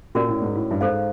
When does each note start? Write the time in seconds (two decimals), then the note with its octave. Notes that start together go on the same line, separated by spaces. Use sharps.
0.15 A#2 C#4 F#4 A#4 D5
0.28 A2
0.42 G#2
0.55 A2
0.71 G2
0.81 G#2 A4 C5 F5